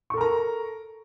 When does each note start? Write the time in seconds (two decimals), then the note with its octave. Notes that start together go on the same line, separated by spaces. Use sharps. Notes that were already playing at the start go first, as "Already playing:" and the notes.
0.10 C#6
0.14 A4
0.17 A#4
0.21 A#5